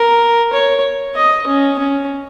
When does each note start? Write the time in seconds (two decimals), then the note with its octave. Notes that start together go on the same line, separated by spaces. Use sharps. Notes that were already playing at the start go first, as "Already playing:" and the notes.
Already playing: A#4
0.53 C#5
1.16 D#5
1.47 C#4
1.79 C#4